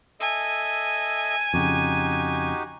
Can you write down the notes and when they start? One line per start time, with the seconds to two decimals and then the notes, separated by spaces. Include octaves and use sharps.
0.20 A4 D#5 E5 G#5
1.54 F2 C#3 D#4 F#4 G4